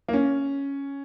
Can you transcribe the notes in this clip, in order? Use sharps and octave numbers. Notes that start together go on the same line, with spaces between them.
A#3
C#4